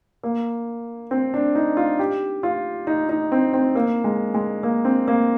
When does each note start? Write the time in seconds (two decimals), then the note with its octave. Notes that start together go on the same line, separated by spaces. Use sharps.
0.23 A#3
1.11 C4
1.34 D4
1.55 D#4
1.77 F4
1.99 G4
2.43 F4
2.87 D#4
3.09 D#4
3.32 C4
3.54 C4
3.75 A#3
4.04 G#3
4.34 G#3
4.63 A#3
4.85 C4
5.08 A#3